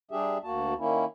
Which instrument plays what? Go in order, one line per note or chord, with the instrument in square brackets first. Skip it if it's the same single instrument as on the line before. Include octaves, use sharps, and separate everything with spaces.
[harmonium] G3 D4 G4 G#4 E5
D2 A#3 F#4 A5
D#3 A#3 C#4 E4